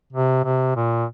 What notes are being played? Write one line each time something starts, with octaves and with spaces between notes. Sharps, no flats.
C3
C3
A#2